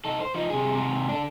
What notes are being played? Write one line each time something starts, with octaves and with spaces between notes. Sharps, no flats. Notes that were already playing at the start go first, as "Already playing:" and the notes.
D#4 A4
C5
F3 D#4
C3 G#4
G#2 C3
D4 A4